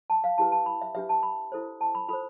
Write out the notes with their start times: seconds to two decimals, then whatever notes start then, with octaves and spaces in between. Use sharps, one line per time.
0.10 A5
0.24 F5
0.38 E4 G4 B4 A5
0.52 A5
0.66 B5
0.81 E5
0.95 D4 G4 B4 E5
1.09 A5
1.23 B5
1.52 E4 A4 C5
1.81 A5
1.95 B5
2.09 F4 A4 C5 B5